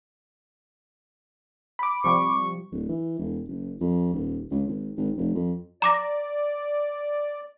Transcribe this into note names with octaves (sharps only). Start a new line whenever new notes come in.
B5 D6
C3 F3 G3 C#6
D1
E3
E1
F#1
F2
D#1
C#2
G#1
G#1
F1
F2
D5 A#5 D6 A#6